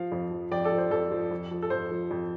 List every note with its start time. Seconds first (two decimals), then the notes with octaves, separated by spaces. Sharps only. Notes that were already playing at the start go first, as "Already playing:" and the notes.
Already playing: F3 F5
0.12 F2
0.31 F3
0.52 F2 D5 G5
0.64 A4 D5
0.72 F3
0.78 C5
0.91 F2 A4
1.12 F3
1.31 F2
1.51 F3
1.62 A4
1.70 F2 C5
1.91 F3
2.11 F2